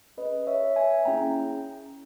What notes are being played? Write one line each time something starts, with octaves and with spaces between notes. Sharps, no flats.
C#4 G#4 B4 D#5
C#5 E5
E5 G#5
A#3 C#4 E4 G#4 G5 A#5